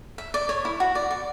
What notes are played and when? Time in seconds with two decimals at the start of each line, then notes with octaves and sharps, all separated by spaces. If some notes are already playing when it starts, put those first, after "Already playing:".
0.18 E5
0.34 D5
0.49 C#5
0.65 E4
0.80 F#4
0.95 D5
1.11 D5